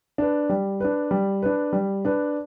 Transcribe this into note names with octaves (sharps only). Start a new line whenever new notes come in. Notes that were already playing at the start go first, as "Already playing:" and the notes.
D4 B4
G3
D4 B4
G3
D4 B4
G3
D4 B4